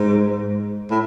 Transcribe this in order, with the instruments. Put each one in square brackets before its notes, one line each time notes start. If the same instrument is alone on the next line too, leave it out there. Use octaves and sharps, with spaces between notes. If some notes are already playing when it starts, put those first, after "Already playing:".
Already playing: [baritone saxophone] G#2
A2